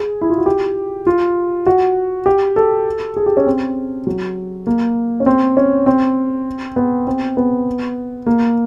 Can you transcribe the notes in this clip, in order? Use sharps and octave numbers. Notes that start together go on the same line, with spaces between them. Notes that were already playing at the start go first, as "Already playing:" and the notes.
Already playing: G#4
E4
F4
F#4
G4
F4
F#4
G4
A4
G#4
G4
C#4
C4
F#3
A#3
C#4
C4
C#4
C4
B3
C4
B3
A#3